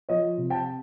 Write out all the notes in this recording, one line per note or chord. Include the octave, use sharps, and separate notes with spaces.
F3 C#5 D#5
C3
G5 A5